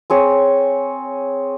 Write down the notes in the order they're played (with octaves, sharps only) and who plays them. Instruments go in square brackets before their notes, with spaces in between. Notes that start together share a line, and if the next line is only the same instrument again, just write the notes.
[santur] C4 G#4 C#5